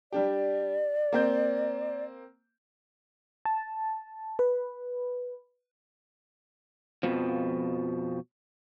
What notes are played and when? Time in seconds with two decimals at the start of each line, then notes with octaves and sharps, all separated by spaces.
0.12 G3 D4 G4 D5
1.13 A#3 C4 G6
3.45 A5
4.39 B4
7.03 F2 B2 F3